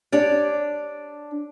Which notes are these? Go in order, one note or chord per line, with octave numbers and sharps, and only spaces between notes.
D4 G4 C#5 D5